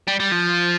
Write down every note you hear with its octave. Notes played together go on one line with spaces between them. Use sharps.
G3
G3
F3